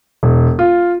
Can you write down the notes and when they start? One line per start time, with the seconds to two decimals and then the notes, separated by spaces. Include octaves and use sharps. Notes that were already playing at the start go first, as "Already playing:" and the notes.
0.23 E1
0.59 F4